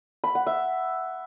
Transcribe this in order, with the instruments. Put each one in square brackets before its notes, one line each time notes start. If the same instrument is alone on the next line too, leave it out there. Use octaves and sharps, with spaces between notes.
[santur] B5
F#5
E5